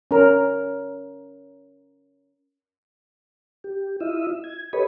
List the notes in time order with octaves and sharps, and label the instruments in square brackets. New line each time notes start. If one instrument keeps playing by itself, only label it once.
[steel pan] C#4 A#4
[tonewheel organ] G4
E4 F4 D#5 E5
G#6
G4 A4 B4 C#5 D#5 B5